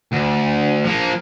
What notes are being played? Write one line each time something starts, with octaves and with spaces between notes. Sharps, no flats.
D2
F3 A#3